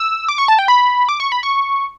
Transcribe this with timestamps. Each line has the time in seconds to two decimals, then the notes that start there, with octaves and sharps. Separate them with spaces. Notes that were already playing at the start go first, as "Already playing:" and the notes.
Already playing: E6
0.28 D6
0.38 C#6
0.48 A5
0.59 G5
0.68 B5
1.09 D6
1.20 C#6
1.32 B5
1.43 C#6